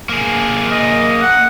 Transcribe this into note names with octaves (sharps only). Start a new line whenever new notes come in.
A#3 G#4
D#5
F#5